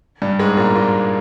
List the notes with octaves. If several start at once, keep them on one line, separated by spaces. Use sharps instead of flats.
G2 G3
G#2 G#3
A#2 A#3
A#2 A#3